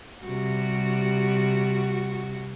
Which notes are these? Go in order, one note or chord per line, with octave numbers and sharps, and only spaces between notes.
C3 G3 F#4